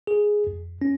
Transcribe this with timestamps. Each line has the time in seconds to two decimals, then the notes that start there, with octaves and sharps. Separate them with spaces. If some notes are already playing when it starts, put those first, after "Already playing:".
0.07 G#4
0.47 F2
0.82 C#4